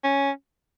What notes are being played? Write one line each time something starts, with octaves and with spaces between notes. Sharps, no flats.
C#4